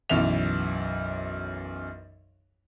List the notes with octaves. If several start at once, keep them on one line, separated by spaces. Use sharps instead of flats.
B1 F#2 E3 E5 F7